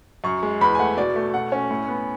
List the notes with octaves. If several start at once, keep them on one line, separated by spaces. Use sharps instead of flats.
F#2 C#6
G#3
E2 B5
G#5
A3 F#5
B2 D5
A3
B2 F#5
C#4
A2
B3